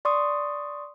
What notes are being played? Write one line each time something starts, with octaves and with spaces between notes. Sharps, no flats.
D5 C6 C#6 D#6